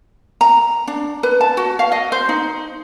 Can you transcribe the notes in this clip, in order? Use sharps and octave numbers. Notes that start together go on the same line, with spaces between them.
A#5
D4
B4
A5
F#4
F5
D#5
C5
D#4